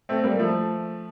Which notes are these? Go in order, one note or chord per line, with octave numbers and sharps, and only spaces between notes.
A3 C4
G3 A#3
F3 A3